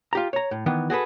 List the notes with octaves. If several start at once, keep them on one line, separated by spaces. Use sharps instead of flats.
F4 G4 A#5
C#5 A#5
A2
D#3 E3 B3
F#4 G#4 A4 B4